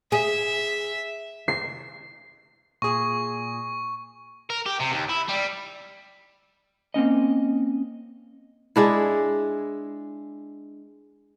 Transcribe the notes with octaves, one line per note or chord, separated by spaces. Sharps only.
G#4 E5
C7
A#2 G#4 C#6
A#4
G4
C3
D#2
E4
G3
A#3 C4 C#4 D#5
G#3 D4 E4